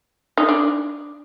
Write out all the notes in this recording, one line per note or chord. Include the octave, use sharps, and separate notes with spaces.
D#4
D4